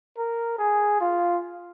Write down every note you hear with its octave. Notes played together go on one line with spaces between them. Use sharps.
A#4
G#4
F4